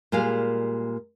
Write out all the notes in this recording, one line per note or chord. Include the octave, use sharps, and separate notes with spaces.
A#2 G3 G#3 A#4 F5